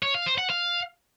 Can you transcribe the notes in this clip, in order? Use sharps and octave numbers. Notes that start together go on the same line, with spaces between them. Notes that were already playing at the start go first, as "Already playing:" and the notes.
C#5
F5
C5
F#5
F5